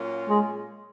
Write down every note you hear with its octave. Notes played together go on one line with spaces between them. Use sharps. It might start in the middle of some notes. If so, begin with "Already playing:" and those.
Already playing: A#2 F#3 A#3 C#4 F4
G#3